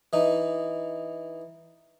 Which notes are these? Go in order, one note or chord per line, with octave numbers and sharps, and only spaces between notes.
E3 D#4